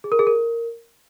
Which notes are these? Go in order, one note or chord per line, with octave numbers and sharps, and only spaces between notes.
G#4
A#4
G#4
A#4